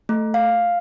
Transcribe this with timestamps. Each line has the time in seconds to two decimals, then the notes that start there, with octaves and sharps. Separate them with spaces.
0.09 A3
0.34 F5